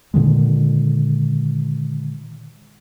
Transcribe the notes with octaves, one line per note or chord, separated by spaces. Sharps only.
A#2 D3 D#3 G#3